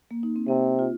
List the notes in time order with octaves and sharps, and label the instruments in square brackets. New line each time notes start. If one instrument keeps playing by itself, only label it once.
[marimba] A#3
D#4
C4
[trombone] C3 [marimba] C4
[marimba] F4